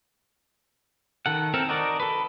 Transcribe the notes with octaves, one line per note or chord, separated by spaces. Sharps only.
D#3 A4 F#5
E3 C4 A4 A#4
D#4 F#4 A#4 D5 A5
A4 B4